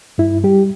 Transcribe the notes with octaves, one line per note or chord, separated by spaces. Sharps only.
G2 E4
G3 G4